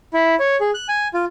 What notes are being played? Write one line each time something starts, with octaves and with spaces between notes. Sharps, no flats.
E4
C#5
G#4
F#6
G#5
F4